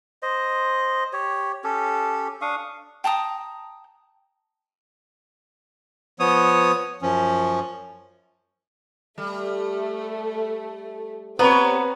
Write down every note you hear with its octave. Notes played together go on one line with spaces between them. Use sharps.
C5 D#5
G4 C#5
C#4 G4 A4
D4 F5 C#6 D#6
G5 A5 A#5 D#6
F3 B3 C#5 D#6
F#2 F3 C#4
G3 A3
B3 C4 G4 B4 C#5 A#5